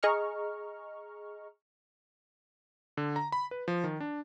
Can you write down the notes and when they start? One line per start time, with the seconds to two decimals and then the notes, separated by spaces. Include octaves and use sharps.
0.03 G#4 D#5 A#5 C#6 F6
2.97 D3
3.16 A#5
3.32 B5
3.51 B4
3.68 F3
3.84 D#3
4.00 D4